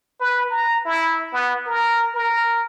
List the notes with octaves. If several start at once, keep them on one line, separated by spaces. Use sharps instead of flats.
B4
A#5
E4
B3
A#4
A#4